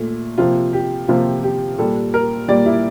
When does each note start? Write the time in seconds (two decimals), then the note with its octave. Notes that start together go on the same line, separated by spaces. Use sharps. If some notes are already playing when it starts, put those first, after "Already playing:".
Already playing: A#2 A3
0.38 C3 F3 A#3 F4
0.73 G4
1.08 C3 F3 A#3 F4
1.43 G4
1.78 A#2 G3 A#3 A4
2.14 A#4
2.48 A#2 G3 A#3 D5
2.66 E4